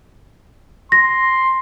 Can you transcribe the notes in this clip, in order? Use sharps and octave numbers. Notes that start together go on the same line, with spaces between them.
C6 A#6